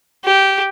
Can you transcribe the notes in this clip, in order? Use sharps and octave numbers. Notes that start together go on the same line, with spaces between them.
G4